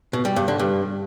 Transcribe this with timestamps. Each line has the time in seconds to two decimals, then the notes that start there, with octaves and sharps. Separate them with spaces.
0.13 B2
0.25 G3
0.36 G2
0.48 D3
0.59 G2